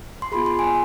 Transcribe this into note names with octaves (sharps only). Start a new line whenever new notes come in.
C6
B3 F4 G#4 B5
C6
G#5